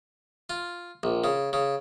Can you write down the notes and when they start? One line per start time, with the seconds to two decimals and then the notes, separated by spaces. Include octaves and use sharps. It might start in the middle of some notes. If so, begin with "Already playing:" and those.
0.50 F4
1.03 A#1
1.24 C#3
1.53 C#3